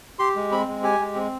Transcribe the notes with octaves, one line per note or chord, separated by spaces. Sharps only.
G4 C6
G#3
C4 B5
G#3
G4 G#5
G#3
C4